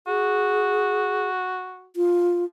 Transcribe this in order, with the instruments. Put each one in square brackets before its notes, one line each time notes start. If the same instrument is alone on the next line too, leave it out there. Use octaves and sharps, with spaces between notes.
[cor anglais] F#4 [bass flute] G#4
[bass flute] F4